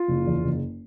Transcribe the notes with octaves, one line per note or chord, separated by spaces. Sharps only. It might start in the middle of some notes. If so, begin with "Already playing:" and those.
Already playing: F4
F#1
E2
F#1